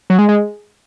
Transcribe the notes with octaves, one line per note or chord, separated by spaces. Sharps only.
F#3
G#3
G#3